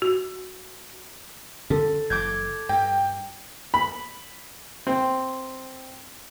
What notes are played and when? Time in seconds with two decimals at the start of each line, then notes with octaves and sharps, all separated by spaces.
0.02 F#4
1.70 D3 C#4 A4
2.10 F#1 E3 D6 G6 G#6
2.69 G2 G5
3.74 B5
4.87 C4